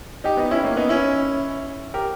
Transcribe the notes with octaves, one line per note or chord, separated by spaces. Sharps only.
D#4 G4
B3 D#4
C#4 E4
A#3 C#4
B3 D#4
C#4 E4
G4 A#4